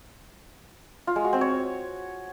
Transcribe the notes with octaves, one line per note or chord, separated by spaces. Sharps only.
F4
G#3
F#4
C4
C#5